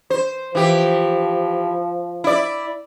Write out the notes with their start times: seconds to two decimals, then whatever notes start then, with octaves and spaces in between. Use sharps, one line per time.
0.10 C5
0.55 E3 F3 G4
2.24 E4 D5